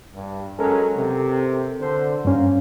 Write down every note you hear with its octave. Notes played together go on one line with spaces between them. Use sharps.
G2
F#3 G#3 C#4 A4 A#4
C3
D3 C5
G2 A#3 C#4